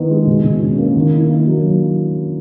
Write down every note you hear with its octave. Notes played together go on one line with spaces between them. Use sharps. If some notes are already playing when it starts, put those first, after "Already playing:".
Already playing: D#3 B3 E4
G#3
B2
B2
C#4
A#3
D#3
E4
A#3
F#3